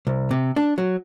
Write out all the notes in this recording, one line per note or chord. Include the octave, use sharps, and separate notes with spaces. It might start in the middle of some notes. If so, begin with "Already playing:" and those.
C2
C3
D4
F#3